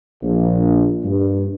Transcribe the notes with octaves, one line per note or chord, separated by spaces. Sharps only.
A#1
G2